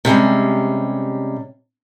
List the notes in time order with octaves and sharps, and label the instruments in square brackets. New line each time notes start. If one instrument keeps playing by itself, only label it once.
[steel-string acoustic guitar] C3 G3 G#3 C#4